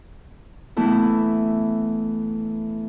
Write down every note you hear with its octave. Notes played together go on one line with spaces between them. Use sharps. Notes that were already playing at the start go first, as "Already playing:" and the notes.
E3 A3 B3 E4